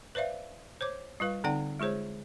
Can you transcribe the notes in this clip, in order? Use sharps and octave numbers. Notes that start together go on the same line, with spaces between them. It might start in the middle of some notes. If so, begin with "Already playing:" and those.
B4 C5 D5 E5 F5
C5 C#5 D6
G3 F4 B4 F5
D3 C4 D#4 D5 F#5 G5
G#3 F4 G#4 C5 C#5